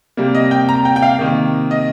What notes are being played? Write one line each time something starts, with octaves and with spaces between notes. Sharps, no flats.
C3 G3 A#3
D#5
G5
A#5
G5
G5
F5
C3 D#3 A#3
D#5